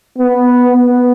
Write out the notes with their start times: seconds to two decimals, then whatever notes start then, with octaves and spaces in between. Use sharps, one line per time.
0.18 B3
0.74 B3